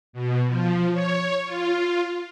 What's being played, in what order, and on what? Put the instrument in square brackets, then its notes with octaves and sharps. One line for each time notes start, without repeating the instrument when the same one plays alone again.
[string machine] B2
F3
C#5
F4